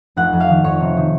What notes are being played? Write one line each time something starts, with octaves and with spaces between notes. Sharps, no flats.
F1 F#5
F2
F5
D#3
F2 C#5
C3
D#3